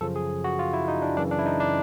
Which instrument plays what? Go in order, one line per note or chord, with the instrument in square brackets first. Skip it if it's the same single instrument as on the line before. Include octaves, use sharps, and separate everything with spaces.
[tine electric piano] F#2 C#3 F3 A4
G#4
F#4
F4
E4
D#4
D4
F#2 C#3 E3 D4
D4
E4
D#4
D4